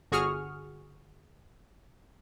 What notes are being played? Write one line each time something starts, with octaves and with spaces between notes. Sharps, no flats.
G1 F#4 G#4 C#6 D#6 F6